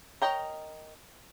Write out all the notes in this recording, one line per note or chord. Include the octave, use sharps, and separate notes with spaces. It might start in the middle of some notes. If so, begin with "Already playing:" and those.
A#4 C#5 D#5 G5 A#5